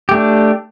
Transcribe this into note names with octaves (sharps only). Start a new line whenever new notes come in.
A3 D4 G4